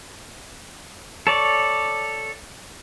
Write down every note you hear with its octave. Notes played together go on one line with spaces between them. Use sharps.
A4 C#5 D5